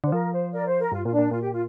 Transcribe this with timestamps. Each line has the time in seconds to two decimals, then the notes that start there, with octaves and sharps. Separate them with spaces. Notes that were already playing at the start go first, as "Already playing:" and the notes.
0.04 D3 C5
0.12 F3 A#4
0.32 C5
0.52 A#4 D5
0.65 C5
0.79 A#4
0.92 G2 F4
1.05 A#2 F4
1.12 D4
1.19 A#2
1.31 A#2 F4
1.41 G4
1.52 F4